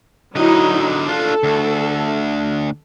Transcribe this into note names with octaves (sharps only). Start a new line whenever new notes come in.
D3 F#3 D#4 E4 D#5
D4 F4 A4
D2